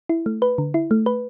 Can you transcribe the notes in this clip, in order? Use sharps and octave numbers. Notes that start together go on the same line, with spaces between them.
E4
A3
B4
D3
E4
A3
B4